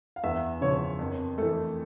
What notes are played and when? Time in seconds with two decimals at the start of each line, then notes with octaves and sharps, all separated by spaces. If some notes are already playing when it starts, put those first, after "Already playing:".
0.16 F5
0.23 E2 E5
0.61 C#3 F3 C#5
0.99 F2 A#4
1.38 E3 A3 A4